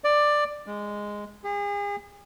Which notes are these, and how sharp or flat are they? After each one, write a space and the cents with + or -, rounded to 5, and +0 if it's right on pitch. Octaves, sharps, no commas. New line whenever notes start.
D5 +10
G#3 -5
G#4 -40